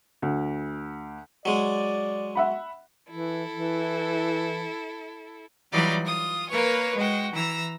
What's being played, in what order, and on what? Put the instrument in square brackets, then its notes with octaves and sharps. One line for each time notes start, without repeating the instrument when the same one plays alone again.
[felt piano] D2
[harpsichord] F#3 G#3 [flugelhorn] D5
[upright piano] E5 F#5 B5
[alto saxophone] E3 [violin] E4 A4
[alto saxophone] E3
[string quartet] E3 F#3 G3 D#4 F4 D5
F4 D#6
A#3 A#4 B4 C#5
G#3 F#4 G5
E3 A#5 E6